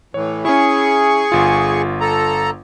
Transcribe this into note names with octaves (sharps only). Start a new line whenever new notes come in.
A2 E3 C#5
C#4 E4 G#4 C#6
G1 F4
A4 A#5